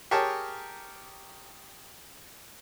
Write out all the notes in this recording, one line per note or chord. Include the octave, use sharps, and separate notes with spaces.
G4 G#4 A#4 C#5 G5 A5